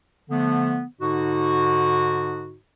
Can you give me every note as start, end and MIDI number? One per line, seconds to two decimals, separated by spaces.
0.30 0.83 50
0.30 0.83 53
0.30 0.83 57
0.30 0.83 59
1.01 2.55 44
1.01 2.55 50
1.01 2.55 63
1.01 2.55 66